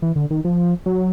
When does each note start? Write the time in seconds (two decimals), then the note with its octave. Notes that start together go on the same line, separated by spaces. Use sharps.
0.02 E3
0.16 D3
0.31 D#3
0.45 F3
0.86 F#3